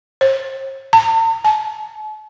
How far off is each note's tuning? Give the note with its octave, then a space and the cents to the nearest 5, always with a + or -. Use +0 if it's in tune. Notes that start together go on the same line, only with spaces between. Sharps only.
C5 +45
A5 +45
A5 -40